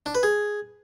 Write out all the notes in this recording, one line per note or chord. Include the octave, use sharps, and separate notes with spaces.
D4
B4
G#4